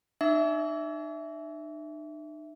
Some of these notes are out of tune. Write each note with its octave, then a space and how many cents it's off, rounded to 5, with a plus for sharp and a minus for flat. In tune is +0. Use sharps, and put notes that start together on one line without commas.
D#4 -45 E5 +0 D6 -45